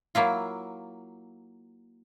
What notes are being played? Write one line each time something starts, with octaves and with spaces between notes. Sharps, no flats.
F#3 A#3 E4 F4